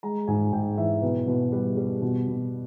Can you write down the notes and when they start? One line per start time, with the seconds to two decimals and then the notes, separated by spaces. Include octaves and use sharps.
0.03 G#3 A#5
0.28 G#2 G#5
0.53 G#2 G5
0.78 E3 E5
1.02 B2 B4
1.27 B2 B4
1.52 G3 B4
1.77 G3
2.02 B2
2.28 B2